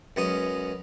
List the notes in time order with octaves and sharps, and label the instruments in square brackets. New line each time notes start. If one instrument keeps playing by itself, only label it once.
[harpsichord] F#2 G#3 B3 C#4 D#6